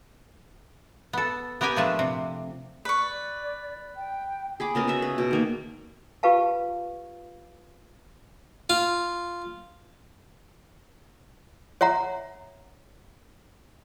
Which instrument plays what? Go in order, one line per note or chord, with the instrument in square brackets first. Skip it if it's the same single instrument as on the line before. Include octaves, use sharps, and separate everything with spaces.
[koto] B3 A4
B3 G4 A#4 G5 G#5
A#2 F3 A3 D4 B4 E5
C3
[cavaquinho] B4 C#6 [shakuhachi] D5
[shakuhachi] G5
[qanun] G#4 B5 D6
C#3 B3 A#4 D#5
F#4 B4 E5
B4
B2
D#3 A#3 B4
[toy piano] F4 G4 B4 F5 A5
[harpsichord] F4
[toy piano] C#5 E5 F#5 A#5